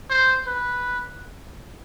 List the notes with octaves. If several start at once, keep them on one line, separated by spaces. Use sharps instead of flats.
C5
B4